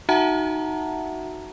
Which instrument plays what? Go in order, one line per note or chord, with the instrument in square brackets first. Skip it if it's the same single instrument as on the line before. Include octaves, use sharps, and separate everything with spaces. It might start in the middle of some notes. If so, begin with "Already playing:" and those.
[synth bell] D#4 F#4 E5 F#5 A5 A#5